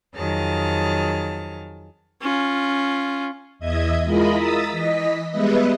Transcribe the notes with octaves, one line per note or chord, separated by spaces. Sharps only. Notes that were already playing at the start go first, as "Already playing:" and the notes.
F2 D#3 F#3 G#4 A5 F6
C#4 F4
E2 D#5 E5 G#6
G#3 E4 F4 A#4 D#5 B5
A#5 D#6 E6 A6 B6
E3 D#5 B6
G3 G#3 B3 B4 D#5 E5